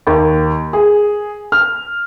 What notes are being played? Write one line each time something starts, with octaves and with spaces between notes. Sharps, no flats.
D#2
G#4
F6